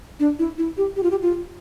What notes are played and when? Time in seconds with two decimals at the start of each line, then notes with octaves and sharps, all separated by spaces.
0.20 D4
0.39 E4
0.58 E4
0.77 G4
0.96 G4
1.03 F4
1.11 G4
1.22 F4